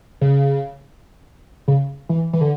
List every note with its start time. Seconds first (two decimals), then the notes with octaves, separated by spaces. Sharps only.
0.21 C#3
1.68 C#3
2.09 E3
2.33 E3
2.41 D3